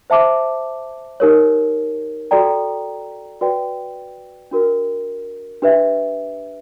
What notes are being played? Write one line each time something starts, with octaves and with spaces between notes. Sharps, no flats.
C5 E5 A5 D6
D#4 G4 A#4 C#5
F#4 A4 D5 G5 A#5
F#4 B4 D5 G5
D4 F#4 A#4
D4 G4 B4 E5